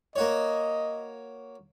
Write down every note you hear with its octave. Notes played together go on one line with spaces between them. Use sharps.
A#3 F#4 C#5 D#5